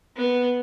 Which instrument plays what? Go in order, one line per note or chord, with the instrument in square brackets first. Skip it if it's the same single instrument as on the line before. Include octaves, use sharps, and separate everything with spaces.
[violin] B3